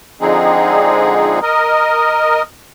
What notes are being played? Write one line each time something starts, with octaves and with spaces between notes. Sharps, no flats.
D3 F3 G#3 C4 D#4 G#4
A#4 D#5